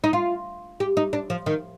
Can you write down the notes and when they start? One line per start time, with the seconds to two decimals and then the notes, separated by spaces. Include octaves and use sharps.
0.04 D#4
0.13 F4
0.80 G4
0.97 D#4
1.13 D4
1.30 F3
1.46 D#3